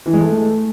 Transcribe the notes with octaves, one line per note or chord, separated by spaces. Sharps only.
E3
G#3
A3